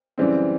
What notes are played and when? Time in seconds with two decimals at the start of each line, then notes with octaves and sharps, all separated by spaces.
0.18 F#2 C#3 E3 G3 C4